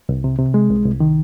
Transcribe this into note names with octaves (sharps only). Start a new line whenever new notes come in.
C2
C3
C3
G#3
C2
C2
D#3